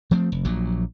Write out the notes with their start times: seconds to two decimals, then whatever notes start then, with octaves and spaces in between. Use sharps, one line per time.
0.11 F3 A3 C4
0.32 F1
0.45 A#1 A#2 F#3